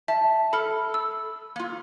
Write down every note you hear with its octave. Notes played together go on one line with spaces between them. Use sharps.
E5 A5
A4 B5 F6
E6
A#3 F4